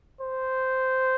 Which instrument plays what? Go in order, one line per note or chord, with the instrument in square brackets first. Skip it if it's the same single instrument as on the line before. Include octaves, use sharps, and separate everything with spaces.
[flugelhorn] C5